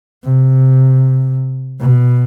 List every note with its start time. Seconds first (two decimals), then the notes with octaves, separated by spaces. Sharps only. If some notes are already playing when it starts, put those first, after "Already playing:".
0.24 C3
1.81 B2